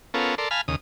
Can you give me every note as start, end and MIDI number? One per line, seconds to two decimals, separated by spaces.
0.14 0.35 59
0.14 0.35 61
0.14 0.35 65
0.14 0.35 69
0.14 0.35 70
0.38 0.49 69
0.38 0.49 70
0.38 0.49 74
0.38 0.49 84
0.51 0.61 77
0.51 0.61 80
0.51 0.61 81
0.51 0.61 83
0.51 0.61 89
0.68 0.76 39
0.68 0.76 49
0.68 0.76 87